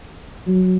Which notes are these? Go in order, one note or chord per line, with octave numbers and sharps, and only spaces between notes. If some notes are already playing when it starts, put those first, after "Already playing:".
F#3